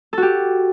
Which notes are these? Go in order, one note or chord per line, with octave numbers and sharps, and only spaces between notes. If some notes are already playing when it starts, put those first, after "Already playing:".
F#4 G4 A4